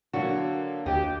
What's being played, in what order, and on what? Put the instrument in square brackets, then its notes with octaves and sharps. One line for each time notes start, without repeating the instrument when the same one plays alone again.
[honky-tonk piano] D3 F#3 A#3 [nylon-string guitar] F#4
[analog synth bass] D#2 [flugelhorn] G4 [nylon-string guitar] D#5